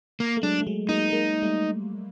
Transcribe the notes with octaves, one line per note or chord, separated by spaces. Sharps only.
A#3
A3
F#3 G#3 D4
A3
F#3 G#3
G#3 A#3 D#4
G#3 A#3
G3 A3